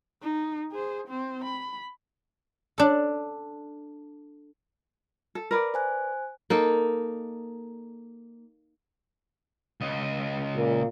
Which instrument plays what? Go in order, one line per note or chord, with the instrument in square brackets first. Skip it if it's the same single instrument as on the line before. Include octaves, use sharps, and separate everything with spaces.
[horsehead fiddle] D#4
G#4 C5
C4 C5
B5
[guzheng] D4 A4
[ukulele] A4
A#4 B4 D5
[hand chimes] C5 G#5 F#6
[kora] A#3 D#4 A4
[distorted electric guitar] C#2 D#5
[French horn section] A#2